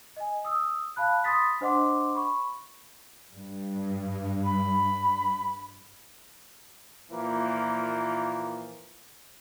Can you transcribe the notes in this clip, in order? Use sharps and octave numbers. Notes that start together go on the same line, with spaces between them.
D#5 G#5
D#6 E6
F5 A5 B5 F#6
B5 C6 D#6 A6 B6
D4 C5 D#5 F#5 C6 D6
B5 C#6
G2
B5
A#2 E3 F3 A#3